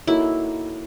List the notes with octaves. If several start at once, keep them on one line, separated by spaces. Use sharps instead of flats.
A#3 D#4 E4 F#4 A4 C#5